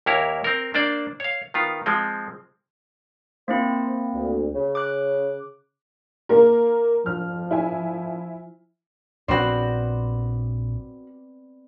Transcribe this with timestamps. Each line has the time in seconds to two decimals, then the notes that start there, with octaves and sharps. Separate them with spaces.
0.06 D#2 A#3 E4 A#4 C#5
0.44 C4 A#4
0.74 A#3 D4 C5 D5
1.20 C#5 F5
1.54 D#3 B3 F4
1.86 F3 G#3 C4
3.48 A#3 C4 E4 C5
4.14 D2
4.54 C#3
4.75 D6 F#6
6.29 A#3 A#4
7.06 F3 F6
7.51 E4 G#5
9.28 A#1 F3 B3 C4 F#4 C5 D5